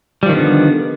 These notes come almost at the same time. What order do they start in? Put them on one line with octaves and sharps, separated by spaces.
G3 F3 D#3 D3 B3